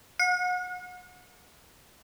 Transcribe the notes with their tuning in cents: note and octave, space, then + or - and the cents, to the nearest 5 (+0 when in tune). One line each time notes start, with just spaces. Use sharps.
F#5 -45